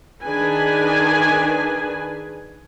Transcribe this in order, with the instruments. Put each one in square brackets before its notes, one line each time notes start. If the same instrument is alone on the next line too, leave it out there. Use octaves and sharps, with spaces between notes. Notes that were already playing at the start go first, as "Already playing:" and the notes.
[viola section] D#3 D4 G#4 B4 G#5